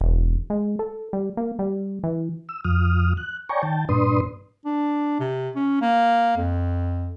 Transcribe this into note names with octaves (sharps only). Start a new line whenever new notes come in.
E1
G#3
A4
G3
A#3
G3
E3
E6
F2 F3 D#6 F6
F#6
C#5 D5 G5 G#5 A#5 C#6
D#3 G5 A5
G2 A#2 D4 B4 C6 D#6
D4
C3
C#4
A#3
F2